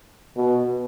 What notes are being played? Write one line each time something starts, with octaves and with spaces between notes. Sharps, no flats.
B2